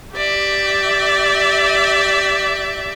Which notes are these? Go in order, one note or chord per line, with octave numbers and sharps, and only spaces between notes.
G4 D5 E5